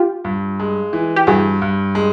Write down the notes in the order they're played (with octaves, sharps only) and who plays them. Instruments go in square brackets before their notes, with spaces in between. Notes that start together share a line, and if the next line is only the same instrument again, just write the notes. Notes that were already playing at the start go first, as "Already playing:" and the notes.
Already playing: [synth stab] F4 G4
[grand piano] G2
G#3
E3
[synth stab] G4
[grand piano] G2 [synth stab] F#4 G#4
[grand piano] G2
G#3